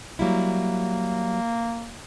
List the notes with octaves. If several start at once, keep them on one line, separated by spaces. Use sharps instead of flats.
F#3 G3 A#3 E4